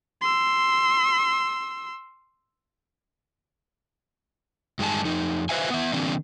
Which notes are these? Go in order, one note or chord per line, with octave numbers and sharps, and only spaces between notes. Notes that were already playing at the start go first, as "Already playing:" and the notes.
C6 E6
G2 G#3 D#4 G#5 A5
F2 D#4
B4 C5 E5 F5 G#5
B3 E5
D3 E3 A#3 C4 D4